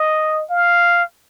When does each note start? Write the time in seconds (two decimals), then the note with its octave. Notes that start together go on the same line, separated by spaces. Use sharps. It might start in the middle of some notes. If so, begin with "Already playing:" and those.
Already playing: D#5
0.50 F5